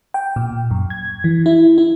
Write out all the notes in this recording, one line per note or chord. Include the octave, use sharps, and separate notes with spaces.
G5
A#2
F#2
G#6
E3
E4
E4